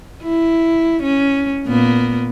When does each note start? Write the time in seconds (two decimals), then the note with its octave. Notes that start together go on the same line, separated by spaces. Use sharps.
0.23 E4
1.03 C#4
1.67 A#2 A#3 B3